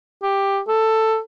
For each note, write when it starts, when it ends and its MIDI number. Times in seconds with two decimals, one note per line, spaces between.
0.23 0.60 67
0.68 1.18 69